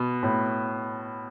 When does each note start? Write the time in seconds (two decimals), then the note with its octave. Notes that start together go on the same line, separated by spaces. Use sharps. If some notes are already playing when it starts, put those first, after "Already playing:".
Already playing: B2
0.23 A2